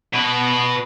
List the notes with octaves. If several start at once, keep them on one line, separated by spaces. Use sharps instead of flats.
B2 B4